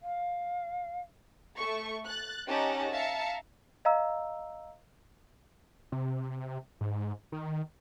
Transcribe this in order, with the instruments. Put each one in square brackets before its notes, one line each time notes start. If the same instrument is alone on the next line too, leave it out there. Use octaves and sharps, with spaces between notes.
[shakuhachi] F5
[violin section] A3 A4 C#6
F#6 A6
C#4 D#4 G4 F#5 A5 A#5
E5 F5 A5 A#5 C#7
[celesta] D#5 F5 A#5 E6
[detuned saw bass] C3
G#2
D#3